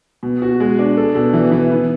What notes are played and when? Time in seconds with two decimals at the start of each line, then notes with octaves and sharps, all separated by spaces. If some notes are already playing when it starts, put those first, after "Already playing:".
0.23 B2
0.42 F#4
0.60 G#3
0.79 D4
0.97 A4
1.15 B2
1.33 E3
1.51 E3
1.71 B3